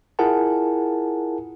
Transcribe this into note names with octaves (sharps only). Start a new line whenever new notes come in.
E4 F4 G#4 A#4 F#5 A5